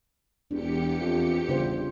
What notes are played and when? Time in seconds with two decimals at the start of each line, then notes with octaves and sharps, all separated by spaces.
0.51 E1 E2 D4 G4 C#7
1.01 F2
1.49 G1 C#3 F4 C5